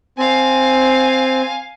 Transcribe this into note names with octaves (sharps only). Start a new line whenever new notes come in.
C4 F5 G#5